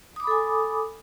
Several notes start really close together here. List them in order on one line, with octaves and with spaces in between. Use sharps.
D#6 D6 B5 A4 G#5